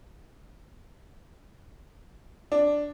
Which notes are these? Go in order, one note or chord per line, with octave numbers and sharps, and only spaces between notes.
D4